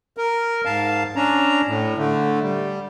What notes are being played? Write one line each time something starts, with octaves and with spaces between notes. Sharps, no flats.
A#4
G#2 F5 A5
C#4 D4 A#5
A2
D3 A3
G3